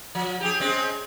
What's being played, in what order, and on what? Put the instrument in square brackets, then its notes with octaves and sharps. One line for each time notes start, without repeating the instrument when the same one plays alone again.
[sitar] F3
G4 G#4
G#3 C4 C#4